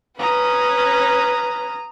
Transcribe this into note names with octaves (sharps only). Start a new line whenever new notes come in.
C#4 B4 A#5 D#6